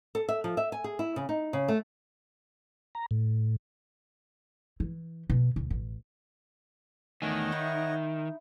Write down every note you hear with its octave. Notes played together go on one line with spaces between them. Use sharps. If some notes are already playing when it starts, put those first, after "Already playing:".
A4
E5
F3
E5
G#5
G#4
E4
C#3
D#4
C#3
A3
A#5
A2
E3
B2
D2
A1
E2 D#3 A3 C#5 D#5 F#5 G#5
D#4 E4